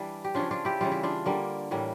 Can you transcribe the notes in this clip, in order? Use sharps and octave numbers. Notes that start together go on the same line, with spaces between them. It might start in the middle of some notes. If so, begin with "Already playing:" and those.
Already playing: E3 G3 D4
G4
C#3 F3 C#4 D4 F4
D4 F4
E4 G4
C#3 E3 G3 F4
E4
D4 F4
D3 G3 A#3
A2 E3 G3 A#3